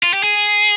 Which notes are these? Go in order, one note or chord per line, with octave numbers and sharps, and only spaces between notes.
F4
G4
G#4